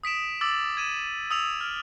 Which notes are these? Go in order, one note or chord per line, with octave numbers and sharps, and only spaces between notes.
D#6 B6 D7 E7
D6 E6 A6 F#7
G#6 D#7 E7
D#6 E6 F7
F6